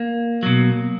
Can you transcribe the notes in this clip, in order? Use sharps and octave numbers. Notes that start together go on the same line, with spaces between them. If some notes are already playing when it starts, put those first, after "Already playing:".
Already playing: A#3
B2 F#3